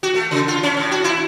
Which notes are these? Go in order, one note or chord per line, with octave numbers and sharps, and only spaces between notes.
F#4
A3
C#3
F4
C#4
A2
F#4
E4